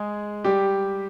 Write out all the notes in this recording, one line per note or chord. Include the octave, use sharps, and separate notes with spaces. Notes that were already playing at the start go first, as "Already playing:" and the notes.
Already playing: G#3 G#4
G3 G4